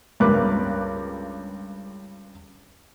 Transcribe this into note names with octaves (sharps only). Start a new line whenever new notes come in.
C#2 G2 A#4 B4 D6 F#6